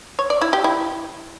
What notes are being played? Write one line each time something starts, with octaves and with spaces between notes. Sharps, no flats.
C#5
D5
E4
G4
E4